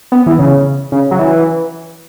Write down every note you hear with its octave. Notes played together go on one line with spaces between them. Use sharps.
B3
E3
C#3
C#3
F#3
E3